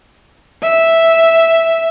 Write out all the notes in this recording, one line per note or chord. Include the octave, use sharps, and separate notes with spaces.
E5